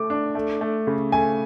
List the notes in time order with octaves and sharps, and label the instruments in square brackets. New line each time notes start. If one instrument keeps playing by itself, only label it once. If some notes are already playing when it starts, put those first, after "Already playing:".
Already playing: [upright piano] A3 [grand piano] D6
[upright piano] D4
A3
A3
C#3
[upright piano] A3 [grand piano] G#5